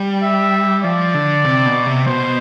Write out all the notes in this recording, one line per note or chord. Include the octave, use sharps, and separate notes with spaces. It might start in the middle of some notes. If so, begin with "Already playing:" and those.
Already playing: G3
E5
F3 D5
D3
C3
B2
C3
B2 C5